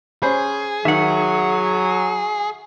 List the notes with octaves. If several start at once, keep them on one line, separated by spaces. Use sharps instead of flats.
C#4 G#4 C5 B5
D#3 F#3 E5 F#5